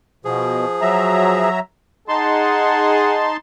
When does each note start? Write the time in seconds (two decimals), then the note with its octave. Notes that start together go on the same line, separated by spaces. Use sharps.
0.25 B2 F3 G#4
0.81 F#3 E5 A#5
2.08 D#4 G#4 F#5 A5 C6